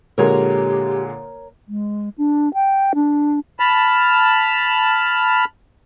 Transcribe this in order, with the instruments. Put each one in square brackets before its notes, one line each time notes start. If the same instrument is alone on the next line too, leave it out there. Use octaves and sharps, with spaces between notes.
[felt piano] A#2 D3 G#3 [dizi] G4 [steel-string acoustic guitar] A#4 C#5 A#5
[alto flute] G#3
D4
G5
D4
[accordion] A5 B5 F6